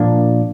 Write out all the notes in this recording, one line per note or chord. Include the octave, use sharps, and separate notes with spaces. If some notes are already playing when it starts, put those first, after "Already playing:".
Already playing: A#2 F3 A#3 D4